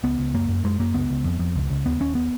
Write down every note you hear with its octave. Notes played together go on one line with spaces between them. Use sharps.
C#2 B3
C#2
F#2 A#3
F#2
F#2 G#3
F#2 A#3
C#2 B3
C#2
F2
F2
C#2
C#2
D#2 B3
D#2 C#4
B3